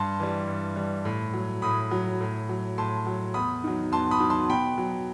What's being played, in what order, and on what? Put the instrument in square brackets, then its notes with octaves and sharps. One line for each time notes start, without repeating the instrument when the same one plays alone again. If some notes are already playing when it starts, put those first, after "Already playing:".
Already playing: [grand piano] G2 A5 C6
E3 G3
G2
E3 G3
A2
F#3
A2 B5 D#6
F#3
A2
F#3
A2 A5 C6
F#3
E2 B5 D#6
D#3 F#3
E2 A5 C6
B5 D#6
D#3 F#3
A5 C6
B2 G5 B5
F#3